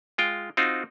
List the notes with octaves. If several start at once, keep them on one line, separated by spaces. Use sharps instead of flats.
G#3 F4 G5
C4 D#4 F4 F#4